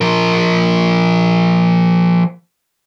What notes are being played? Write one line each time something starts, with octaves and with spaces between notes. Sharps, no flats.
F3 A#4